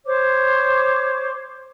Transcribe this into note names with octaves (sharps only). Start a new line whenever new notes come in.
C5 C#5 D6